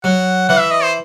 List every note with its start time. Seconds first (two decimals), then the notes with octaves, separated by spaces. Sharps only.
0.04 F#3 F#5
0.49 E3 F#5
0.60 E5
0.71 D#5
0.83 C5